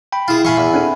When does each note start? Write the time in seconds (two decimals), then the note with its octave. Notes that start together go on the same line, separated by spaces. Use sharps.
0.12 G5 B5
0.28 E4 F4 G#4
0.45 A#2 E3 E5 F5 G#5 B5 C#6
0.57 E2 F5
0.74 C4 D4 A4